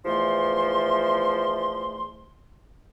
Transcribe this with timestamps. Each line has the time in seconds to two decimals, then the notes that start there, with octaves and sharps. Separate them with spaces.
0.06 E2 G#2 E3 F3 A3 C6